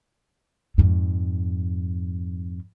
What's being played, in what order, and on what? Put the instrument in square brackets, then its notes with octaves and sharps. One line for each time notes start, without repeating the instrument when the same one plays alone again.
[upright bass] F2 G#2